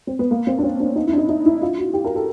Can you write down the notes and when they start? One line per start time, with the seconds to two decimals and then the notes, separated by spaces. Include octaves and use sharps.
0.07 C4
0.19 B3
0.31 A#3
0.47 C4
0.59 D4
0.63 C#4
0.80 D4
0.96 D#4
1.07 E4
1.13 D4
1.18 D#4
1.29 D#4
1.46 E4
1.62 F4
1.78 F#4
1.94 G4
2.05 A#4
2.16 A4